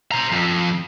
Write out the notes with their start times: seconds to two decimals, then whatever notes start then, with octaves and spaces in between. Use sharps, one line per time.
0.12 C5 A#5
0.32 F2